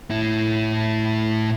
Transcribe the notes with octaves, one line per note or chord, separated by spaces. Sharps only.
A2 E4